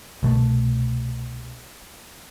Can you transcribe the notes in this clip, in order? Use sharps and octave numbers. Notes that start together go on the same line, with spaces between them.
C2 B2 A3